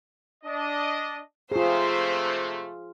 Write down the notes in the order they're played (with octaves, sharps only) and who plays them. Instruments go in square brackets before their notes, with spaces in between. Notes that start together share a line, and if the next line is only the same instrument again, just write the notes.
[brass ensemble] D4 D#5
[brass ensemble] C3 A3 [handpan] F4 G#4 [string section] C5